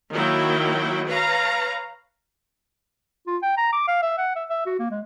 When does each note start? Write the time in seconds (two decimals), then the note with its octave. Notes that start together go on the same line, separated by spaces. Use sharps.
0.13 D#3 F#3 A#3 E4 G5
1.08 B4 C#5 F5 A#5
3.27 F4
3.43 G5
3.57 A#5
3.73 D6
3.88 F5
4.02 E5
4.18 F#5
4.36 E5
4.50 E5
4.66 F#4
4.79 A#3
4.91 G#3